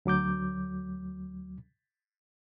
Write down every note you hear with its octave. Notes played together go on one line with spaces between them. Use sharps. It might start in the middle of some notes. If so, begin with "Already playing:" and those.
D2 F#3 D6 G6